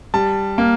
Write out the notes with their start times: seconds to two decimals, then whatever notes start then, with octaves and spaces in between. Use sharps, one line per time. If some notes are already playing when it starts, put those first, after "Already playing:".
0.14 G3 A5
0.58 A#3